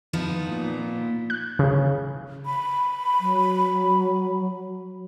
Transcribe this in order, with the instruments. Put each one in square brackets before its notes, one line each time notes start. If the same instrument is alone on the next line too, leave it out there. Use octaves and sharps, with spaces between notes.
[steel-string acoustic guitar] F3 B3 D#4
[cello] A#2
[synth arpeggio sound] F#6
C#3
[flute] B5
[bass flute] F#3